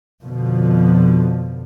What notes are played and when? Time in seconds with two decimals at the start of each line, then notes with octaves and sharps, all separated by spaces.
0.22 F2 B2 D3 F3